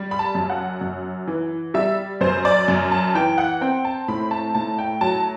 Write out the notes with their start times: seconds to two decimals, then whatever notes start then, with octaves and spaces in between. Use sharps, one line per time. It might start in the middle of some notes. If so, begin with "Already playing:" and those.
Already playing: G3
0.11 B5
0.19 A5
0.35 F#2
0.50 F#5
0.81 F#2
1.28 E3
1.74 G3 E5
2.21 F#2 C5
2.45 D5
2.68 F#2
2.92 A5
3.15 E3 G5
3.38 F#5
3.61 C4 G5
3.85 A5
4.08 A2 B5
4.31 A5
4.55 A2 A5
4.78 G5
5.01 F#3 A5